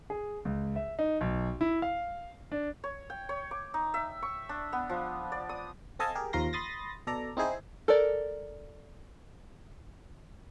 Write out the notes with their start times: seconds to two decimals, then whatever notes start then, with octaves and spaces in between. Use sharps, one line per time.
0.10 G#4
0.45 C#2
0.76 E5
0.99 D#4
1.21 B1
1.61 E4
1.82 F5
2.52 D4
2.84 C#5
3.10 G5
3.29 C#5
3.51 D6
3.74 D#4
3.94 E5
4.22 C#6
4.49 D4
4.73 B3
4.89 F3
5.32 D5
5.49 D#6
5.99 C4 A4 D#5 F5 G#5 A5
6.15 G4 G#4 A#4
6.33 D#2 F3 F4 A#4 C6 A#6
6.53 B5 C6 D#6 A6 A#6
7.07 B2 A4 D5 A#5
7.37 C4 D#4 E4 G#4 C5
7.88 A4 A#4 D5